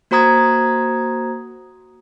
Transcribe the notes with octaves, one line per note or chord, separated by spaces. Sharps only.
A#3 F#4 C5 A#5 D#6 G#6